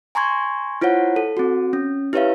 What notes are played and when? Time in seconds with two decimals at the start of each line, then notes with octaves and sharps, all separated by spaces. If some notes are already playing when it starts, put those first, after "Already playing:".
0.15 G#5 A#5 C6 C#6 G#6
0.81 E4 F4 C5 C#5 F#5
1.16 A4
1.37 C4 F#4
1.73 C#4
2.13 E4 G4 B4 C#5 E5 F5